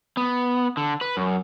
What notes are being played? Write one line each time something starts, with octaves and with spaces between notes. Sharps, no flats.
B3
D3
B4
F#2